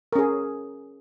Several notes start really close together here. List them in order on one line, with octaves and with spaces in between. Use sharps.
A#4 C#4 G#4